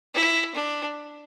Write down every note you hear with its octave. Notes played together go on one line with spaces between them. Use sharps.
E4
D4